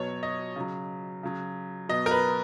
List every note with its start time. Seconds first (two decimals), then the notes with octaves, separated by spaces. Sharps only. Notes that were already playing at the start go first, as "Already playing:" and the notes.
Already playing: B2 F#3 C#5
0.23 D#5
0.56 C#3 F#3
1.23 C#3 F#3
1.89 B2 F#3 D#5
2.06 A#4
2.11 B4